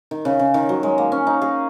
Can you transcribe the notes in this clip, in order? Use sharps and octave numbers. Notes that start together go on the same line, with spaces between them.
D#3
C#3
C#3
D#3
F#3
G#3
A#3
C#4
D#4
G#4